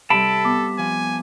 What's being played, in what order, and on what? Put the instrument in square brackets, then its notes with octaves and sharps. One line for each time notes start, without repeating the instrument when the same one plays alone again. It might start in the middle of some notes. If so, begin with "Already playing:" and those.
[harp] C3 G3 [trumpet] A4 [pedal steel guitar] A5 B5 [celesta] D7
[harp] B3 [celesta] D6
[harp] F3 [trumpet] G#5